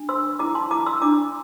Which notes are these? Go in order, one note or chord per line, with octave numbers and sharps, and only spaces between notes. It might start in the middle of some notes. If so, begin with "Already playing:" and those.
Already playing: D4
C5 C6 E6
E4 A#5 D6
A5 C6
E4 A#5 D6
C6 E6
D4 A#5 D6